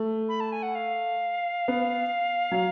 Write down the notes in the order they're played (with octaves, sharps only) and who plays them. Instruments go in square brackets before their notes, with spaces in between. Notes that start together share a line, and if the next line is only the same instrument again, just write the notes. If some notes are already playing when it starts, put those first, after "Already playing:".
Already playing: [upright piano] A3
[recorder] B5
A5
G#5
F#5
F5
[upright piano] B3
F#3